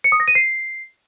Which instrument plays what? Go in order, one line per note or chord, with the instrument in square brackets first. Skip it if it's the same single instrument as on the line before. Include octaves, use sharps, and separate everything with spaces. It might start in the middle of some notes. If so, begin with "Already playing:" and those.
[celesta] C#7
D#6
A#6
D#7
C7